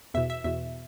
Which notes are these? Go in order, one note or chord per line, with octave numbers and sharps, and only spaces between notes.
E2 B2 E5
E5
E2 B2 E5